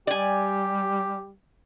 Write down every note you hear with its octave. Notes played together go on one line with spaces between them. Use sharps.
G3 G4 D5 G#5